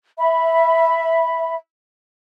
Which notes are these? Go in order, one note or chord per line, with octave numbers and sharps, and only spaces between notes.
E5 B5